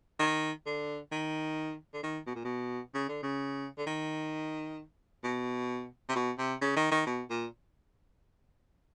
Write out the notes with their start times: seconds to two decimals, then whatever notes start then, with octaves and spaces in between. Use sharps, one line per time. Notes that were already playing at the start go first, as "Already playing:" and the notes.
0.20 D#3
0.66 D3
1.12 D#3
1.94 D3
2.03 D#3
2.27 B2
2.35 A#2
2.45 B2
2.94 C#3
3.09 D3
3.23 C#3
3.78 D3
3.86 D#3
5.23 B2
6.09 C3
6.15 B2
6.38 C3
6.61 C#3
6.76 D#3
6.91 D#3
7.06 B2
7.30 A#2